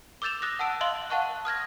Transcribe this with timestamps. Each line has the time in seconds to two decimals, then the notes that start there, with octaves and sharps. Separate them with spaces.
0.22 D6 E6 G6 A6 E7 F7
0.42 D#6 F#6 A#6
0.59 F#5 A5 E6 D7
0.81 D#5 F5 C6 F#6 F#7 G7
1.10 F5 F#5 A5 C#6 F#6
1.45 D#6 F6 G#6 A#6